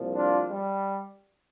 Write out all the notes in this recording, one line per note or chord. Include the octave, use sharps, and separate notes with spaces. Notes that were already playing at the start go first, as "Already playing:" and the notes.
Already playing: C2 A#2 F3
D4 F4
G3